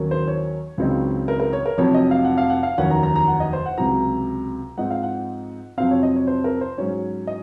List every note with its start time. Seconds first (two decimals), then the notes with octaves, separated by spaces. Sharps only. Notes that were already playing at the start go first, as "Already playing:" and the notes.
Already playing: D#2 D#3 F#3 A#3 C#4
0.11 C5
0.28 C#5
0.78 C#2 C#3 F#3 C4 D#4
1.28 A#4
1.40 A#4
1.53 C#5
1.66 A#4
1.77 F1 F2 C3 F#3 C#5
1.94 D#5
2.11 F5
2.25 F#5
2.38 F5
2.50 F#5
2.63 F5
2.78 F1 D#2 D#3 F#3 C#4 F#5
2.91 A#5
3.03 A#5
3.16 A#5
3.28 F#5
3.40 D#5
3.53 C5
3.66 F#5
3.78 C#2 C3 F#3 A#5
4.78 G#2 F3 C4 D#4 F#5
4.91 F5
5.03 F#5
5.78 F2 C3 F#3 C4 F5
5.91 C#5
6.03 D#5
6.16 C#5
6.27 C5
6.44 A#4
6.61 C5
6.78 G#2 F#3 C#4 C#5
7.27 D#5